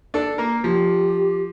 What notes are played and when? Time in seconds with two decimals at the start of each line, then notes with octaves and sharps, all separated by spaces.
0.14 D4 A4
0.38 A#3 A#4
0.64 F3 G4